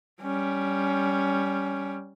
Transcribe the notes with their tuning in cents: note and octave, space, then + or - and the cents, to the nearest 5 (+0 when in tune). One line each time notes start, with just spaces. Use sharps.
G3 +0 C#4 +10